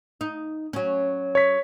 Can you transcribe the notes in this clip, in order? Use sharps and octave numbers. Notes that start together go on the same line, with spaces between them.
D#4
F#3 C#4
C#5 B6